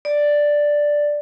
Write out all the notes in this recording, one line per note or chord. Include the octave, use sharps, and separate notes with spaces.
D5